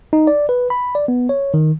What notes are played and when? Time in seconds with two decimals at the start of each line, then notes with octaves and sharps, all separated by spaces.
0.13 D#4
0.27 D5
0.49 B4
0.70 B5
0.95 D5
1.08 B3
1.29 C#5
1.54 D#3